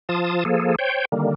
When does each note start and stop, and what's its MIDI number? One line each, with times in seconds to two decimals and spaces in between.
0.09 0.44 53
0.09 0.44 65
0.09 0.44 81
0.09 0.44 87
0.45 0.76 53
0.45 0.76 58
0.45 0.76 68
0.45 0.76 69
0.79 1.05 72
0.79 1.05 73
0.79 1.05 79
1.12 1.34 50
1.12 1.34 51
1.12 1.34 55
1.12 1.34 58